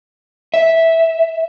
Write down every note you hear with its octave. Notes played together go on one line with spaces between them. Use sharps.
E5